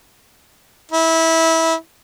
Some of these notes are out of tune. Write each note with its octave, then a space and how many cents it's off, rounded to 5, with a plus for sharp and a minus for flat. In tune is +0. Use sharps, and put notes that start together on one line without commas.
E4 -20